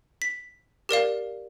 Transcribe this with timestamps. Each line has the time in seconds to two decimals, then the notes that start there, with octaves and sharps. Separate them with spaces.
0.22 B6
0.89 G4 A#4 D5 F5